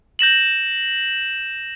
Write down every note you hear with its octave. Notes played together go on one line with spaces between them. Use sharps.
G6 A#6 E7 F#7